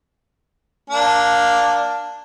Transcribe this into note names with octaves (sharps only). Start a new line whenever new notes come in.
A#3 D4